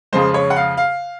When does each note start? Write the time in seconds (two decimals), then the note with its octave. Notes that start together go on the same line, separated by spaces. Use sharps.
0.13 F2 C#3 F3 G#3 C5
0.34 C#5
0.50 F#5
0.56 F5
0.77 F5